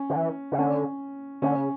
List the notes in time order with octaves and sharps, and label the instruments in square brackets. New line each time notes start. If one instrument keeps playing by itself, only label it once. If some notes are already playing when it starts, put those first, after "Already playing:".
Already playing: [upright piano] C#4
[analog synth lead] D3
E3
C#3
[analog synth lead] D3 [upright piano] C#4
[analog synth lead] D3 [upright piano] C#4
[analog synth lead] C#3